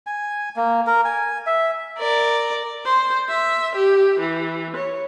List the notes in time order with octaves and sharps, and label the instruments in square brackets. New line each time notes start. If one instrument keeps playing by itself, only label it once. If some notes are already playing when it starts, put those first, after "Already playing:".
[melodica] G#5
A#3
A#4
G#5
E5
[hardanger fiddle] A#4 D5
[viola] C5
E5
G4
E3
C#5